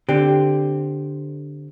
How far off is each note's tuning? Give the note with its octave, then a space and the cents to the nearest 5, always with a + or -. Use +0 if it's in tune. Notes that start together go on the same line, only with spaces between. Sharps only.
D3 +0 C4 +0 G4 +0